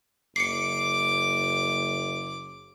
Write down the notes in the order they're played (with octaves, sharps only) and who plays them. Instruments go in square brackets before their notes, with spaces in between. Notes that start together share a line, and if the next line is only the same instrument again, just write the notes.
[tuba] F#1 [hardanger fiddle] D6 [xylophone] C7 C#7